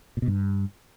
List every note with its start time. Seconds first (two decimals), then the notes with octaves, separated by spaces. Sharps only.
0.17 A#2
0.22 B2
0.27 G2